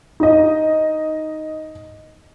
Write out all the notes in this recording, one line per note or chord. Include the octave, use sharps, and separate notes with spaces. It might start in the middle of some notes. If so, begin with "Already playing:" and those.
D#4 D#5